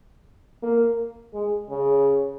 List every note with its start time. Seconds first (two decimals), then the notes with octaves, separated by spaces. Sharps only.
0.63 A#3
1.34 G#3
1.70 C#3